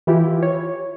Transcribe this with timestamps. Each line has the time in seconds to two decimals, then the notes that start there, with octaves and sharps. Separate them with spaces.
0.07 E3 E4 F4 G4
0.43 C#5